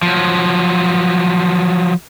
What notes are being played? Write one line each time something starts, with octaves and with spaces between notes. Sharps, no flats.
F3 F#3